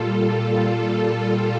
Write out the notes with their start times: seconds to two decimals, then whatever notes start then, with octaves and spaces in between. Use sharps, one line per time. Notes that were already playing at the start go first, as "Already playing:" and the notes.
Already playing: A#2 G3 F4 A4
1.28 F4 A4